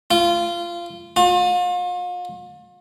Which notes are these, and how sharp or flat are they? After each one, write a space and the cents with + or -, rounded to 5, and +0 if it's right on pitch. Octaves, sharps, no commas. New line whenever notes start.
F4 -20
F4 +40